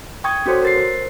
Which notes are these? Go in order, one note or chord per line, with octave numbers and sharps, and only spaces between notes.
G5 C#6 D#6 G#6
C#4 F#4 A4 C5 C#5
A#4 A6 C7
A#4 C5